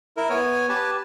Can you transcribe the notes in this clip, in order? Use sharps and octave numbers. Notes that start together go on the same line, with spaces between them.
E4 A#4
B3 C#5 G#5
G4 B4 G#5 A5